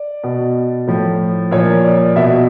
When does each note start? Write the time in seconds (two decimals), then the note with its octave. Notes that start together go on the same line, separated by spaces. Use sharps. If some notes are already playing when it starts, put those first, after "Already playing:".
Already playing: D5
0.24 B2
0.87 A2 F3
1.51 A#2 F3 C#5
1.84 D5
2.16 B2 E5